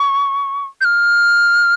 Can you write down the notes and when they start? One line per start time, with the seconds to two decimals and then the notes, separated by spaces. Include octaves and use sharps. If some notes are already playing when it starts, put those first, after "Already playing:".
Already playing: C#6
0.81 G6
0.85 F6